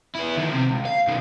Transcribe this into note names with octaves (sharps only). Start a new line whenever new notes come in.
B3 E4
D#3 F3
C3
C#2
F5
B2 D#3